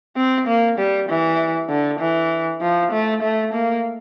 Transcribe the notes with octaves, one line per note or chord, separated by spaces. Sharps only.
C4
A#3
G3
E3
D3
E3
F3
A3
A3
A#3